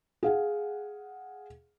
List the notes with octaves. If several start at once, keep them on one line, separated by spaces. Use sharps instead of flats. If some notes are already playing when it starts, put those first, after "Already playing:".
G#4 F5 F#5